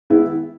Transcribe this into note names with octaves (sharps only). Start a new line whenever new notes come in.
D#3 G#3 B3 E4